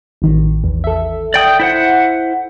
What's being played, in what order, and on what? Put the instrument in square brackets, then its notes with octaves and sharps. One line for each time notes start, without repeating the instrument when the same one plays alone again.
[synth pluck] A1 D#3
E2
A4 E5
[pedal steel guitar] D5 G5 D#6
E4 C5 F#5